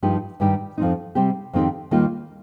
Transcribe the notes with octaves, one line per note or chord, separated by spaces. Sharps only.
G2 F3 D#4 G4
G2 D#3 G3 D#4 G4
F2 F3 C4 D#4
C3 G3 C4 G4
F2 D#3 C4 D#4 G4
D#2 D#3 G3 A#3 F4